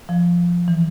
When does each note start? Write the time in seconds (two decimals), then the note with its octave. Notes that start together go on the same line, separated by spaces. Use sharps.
0.09 F3
0.68 E3